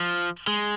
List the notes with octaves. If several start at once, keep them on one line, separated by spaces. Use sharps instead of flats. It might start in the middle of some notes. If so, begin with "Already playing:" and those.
Already playing: F3
G#3